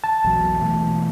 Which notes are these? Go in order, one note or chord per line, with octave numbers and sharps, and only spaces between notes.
A5
A#1 E2 F#3
B2 E3 A3